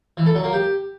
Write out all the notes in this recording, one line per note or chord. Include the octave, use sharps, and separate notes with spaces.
E3
A4
F#3
A#3
G4